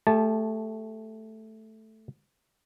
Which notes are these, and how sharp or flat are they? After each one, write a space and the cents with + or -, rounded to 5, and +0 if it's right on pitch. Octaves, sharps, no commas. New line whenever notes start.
A3 +0 G4 +30 A5 -15